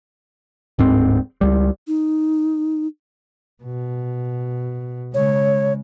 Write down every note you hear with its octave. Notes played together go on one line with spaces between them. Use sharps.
D1 G#2 C4
C#2 G3
D#4
B2
C#3 G#3 C#5